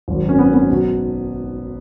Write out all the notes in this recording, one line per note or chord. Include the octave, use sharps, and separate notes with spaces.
G#1 F#2 D#3
C#4
B3
B3
B1 B2 F#3